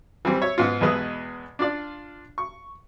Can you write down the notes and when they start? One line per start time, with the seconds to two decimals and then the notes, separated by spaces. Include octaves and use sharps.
0.25 E3 G3 C4
0.42 C#5 E5
0.58 G#2 B3 F4
0.81 E2 B2 G#3 B4 E5 D#6
1.59 D4 F4 D5
2.38 C#6